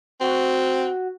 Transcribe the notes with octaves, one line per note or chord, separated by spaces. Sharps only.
C4 F#4